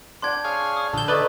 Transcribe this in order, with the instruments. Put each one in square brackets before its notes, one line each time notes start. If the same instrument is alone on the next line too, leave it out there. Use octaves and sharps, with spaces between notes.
[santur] D4 F#5 G5 [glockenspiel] C6 G#6
[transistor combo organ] G#4 C#5 F5
[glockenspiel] D#6
[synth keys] A#1 G6 [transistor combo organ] D3 A4
[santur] A3 D#4 [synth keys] B4 D5